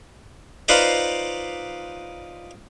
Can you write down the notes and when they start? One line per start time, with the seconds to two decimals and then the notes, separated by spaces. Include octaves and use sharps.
0.68 D#4 F4 B4 C5 D5 D#5